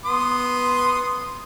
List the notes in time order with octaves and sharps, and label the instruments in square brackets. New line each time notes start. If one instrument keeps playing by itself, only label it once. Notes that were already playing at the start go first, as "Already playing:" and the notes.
[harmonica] B3 C6 D#6